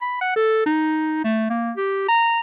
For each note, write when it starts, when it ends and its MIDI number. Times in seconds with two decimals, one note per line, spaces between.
0.01 0.17 83
0.21 0.35 78
0.36 0.65 69
0.66 1.20 63
1.24 1.47 57
1.50 1.71 58
1.77 2.04 67
2.08 2.40 82